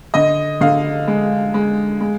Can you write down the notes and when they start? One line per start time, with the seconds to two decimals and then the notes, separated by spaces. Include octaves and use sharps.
0.14 D3 D#5
0.61 D3 F5
1.08 G#3
1.54 G#3
2.01 G#3